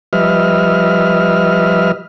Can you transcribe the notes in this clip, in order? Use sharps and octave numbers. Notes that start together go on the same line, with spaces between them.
F3 G3 B4 D#5 E5 F6